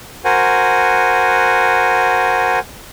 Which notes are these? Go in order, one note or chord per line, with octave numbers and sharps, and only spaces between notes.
F#4 A#4 C5 F#5 G#5